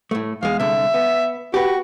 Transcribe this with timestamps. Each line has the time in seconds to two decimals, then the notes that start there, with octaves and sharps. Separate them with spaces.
0.11 A2 A3
0.43 E2 G#3 F5
0.60 C2 D3 E5
0.94 B3
1.54 F#4 G4 B4